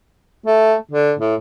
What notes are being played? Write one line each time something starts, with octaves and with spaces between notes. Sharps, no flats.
A3
D3
A2